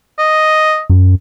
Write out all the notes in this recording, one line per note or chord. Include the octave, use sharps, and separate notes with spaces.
D#5
F#2